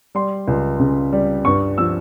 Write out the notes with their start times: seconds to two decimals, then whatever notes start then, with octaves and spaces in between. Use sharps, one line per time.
0.15 G3 C6
0.48 C#2
0.80 C#3
1.13 G3
1.45 G2 C#6
1.78 F3 E6